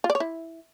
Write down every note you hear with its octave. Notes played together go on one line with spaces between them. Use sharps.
F4
D5
C#5
E4